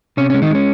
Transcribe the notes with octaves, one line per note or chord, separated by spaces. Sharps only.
C3 C#4
C#4
G#3
D#3 D#4
G#3 C#4